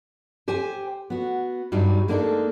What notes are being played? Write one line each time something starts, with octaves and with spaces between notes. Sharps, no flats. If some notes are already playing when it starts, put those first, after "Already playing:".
G4 C5 G5 G#5
B3 F#4
G2 F#3 G3 D#4
G#3 A#3 D4 D#4 A4